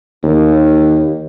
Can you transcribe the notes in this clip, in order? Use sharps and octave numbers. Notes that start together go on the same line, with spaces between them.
D#2